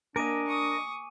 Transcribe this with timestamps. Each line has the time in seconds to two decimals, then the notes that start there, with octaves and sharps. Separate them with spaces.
0.16 A#3 D4 A#4 D#5 G#5 D6 D#7
0.47 C#6 D#6